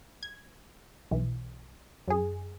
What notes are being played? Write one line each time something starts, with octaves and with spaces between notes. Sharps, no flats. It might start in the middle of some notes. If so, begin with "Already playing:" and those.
G#6
B1 E3
F#2 G#4